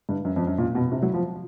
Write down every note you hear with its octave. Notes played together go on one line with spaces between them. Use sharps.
G2
F#2
F2
F#2
A#2
B2
C3
F#3
F3